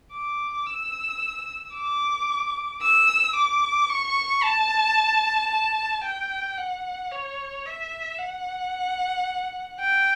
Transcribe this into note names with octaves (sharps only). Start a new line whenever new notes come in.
D6
E6
D6
E6
D6
C#6
A5
A5
G5
F#5
C#5
E5
F#5
G5